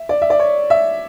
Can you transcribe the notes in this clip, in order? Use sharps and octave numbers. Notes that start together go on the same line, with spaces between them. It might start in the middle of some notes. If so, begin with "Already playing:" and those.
Already playing: E5
D5
E5
D5
C#5
E5